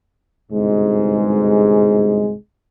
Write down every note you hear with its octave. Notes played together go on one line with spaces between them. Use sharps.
G1 C2 G#2 B2 G#3